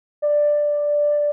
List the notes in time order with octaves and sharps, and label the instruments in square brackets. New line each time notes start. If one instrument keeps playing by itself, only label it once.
[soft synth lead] D5